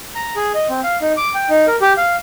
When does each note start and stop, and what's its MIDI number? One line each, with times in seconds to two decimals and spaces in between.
0.15 0.35 82
0.36 0.52 68
0.54 0.68 75
0.69 0.81 60
0.84 0.98 77
1.01 1.13 63
1.17 1.34 86
1.35 1.49 79
1.50 1.66 63
1.67 1.76 70
1.81 1.93 67
1.97 2.16 77